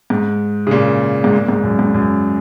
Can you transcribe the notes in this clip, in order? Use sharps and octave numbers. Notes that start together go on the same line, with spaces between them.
G#2
C#3
A#2
G#2
A#2
G#2
F#2
G#2
F#2